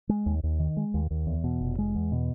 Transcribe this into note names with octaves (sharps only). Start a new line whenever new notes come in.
G#3
D#2
D#2
D#3
G#3
D#2
D#2
E2
B2
F1
G#3
E2
B2